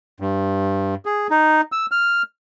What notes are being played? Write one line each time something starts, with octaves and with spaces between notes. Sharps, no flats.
G2
G#4
D#4
E6
F6